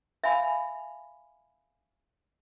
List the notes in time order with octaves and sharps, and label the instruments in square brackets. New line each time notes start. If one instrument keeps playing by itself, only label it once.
[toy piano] E5 F5 G#5 B5